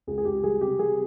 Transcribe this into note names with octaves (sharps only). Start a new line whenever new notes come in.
C#2 G#4
G#4
C#2 G4
G3 G#4
C3 G4
G3 G#4